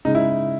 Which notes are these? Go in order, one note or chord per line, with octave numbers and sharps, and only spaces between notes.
C#3 G#3 D#4
E4